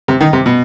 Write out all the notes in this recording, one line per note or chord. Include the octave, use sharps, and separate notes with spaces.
C3
D#3
C3
B2